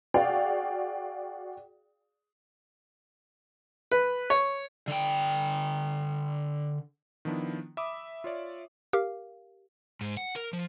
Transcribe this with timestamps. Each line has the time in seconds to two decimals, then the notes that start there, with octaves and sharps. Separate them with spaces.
0.14 F#4 G#4 D5 F5 G5
3.92 B4
4.30 C#5
4.88 D3 G5
7.25 D#3 F3 B3 D4 E4
7.77 E5 B5 D6 D#6
8.24 F4 C#5 D5 E5
8.93 G4 A#4 F5
10.01 G#2
10.17 F#5
10.36 A#4
10.53 F3